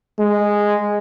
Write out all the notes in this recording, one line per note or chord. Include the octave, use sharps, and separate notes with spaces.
G#3